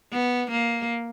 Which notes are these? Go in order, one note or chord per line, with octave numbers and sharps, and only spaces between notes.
B3
A#3